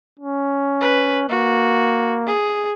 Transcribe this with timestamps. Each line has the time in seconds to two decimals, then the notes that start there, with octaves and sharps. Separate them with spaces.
0.19 C#4
0.81 B4
1.29 A#3 F#4
2.27 G#4